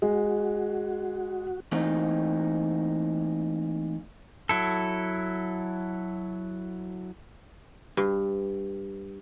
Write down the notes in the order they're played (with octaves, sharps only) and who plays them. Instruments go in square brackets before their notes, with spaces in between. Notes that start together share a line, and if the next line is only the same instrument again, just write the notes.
[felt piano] G#3 [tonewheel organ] F#4
[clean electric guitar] E3 A3 A#3 C4 D#4
[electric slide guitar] F#3 E4 A4
[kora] G2